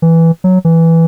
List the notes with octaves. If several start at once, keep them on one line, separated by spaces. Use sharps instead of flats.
E3
F#3
E3